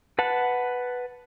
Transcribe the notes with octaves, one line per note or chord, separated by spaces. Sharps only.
B4 F#5 A5